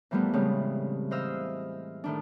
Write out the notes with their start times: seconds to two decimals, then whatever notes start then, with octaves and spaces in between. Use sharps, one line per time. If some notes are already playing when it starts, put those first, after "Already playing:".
0.11 A#2 E3 F3 G3 A3 B3
0.33 A2 C#3 G3 G#3 C4
1.11 E3 C5 D#5 F5 E6
2.04 A2 D#3 D4